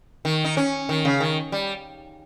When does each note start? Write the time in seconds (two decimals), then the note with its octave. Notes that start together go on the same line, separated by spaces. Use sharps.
0.25 D#3
0.45 D#4
0.57 C#4
0.89 D#3
1.05 C#3
1.20 D#3
1.52 G3